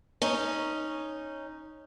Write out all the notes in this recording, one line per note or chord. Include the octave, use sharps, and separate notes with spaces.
C#4 D#4